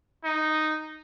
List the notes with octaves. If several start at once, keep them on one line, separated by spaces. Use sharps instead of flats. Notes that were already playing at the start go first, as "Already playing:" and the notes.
D#4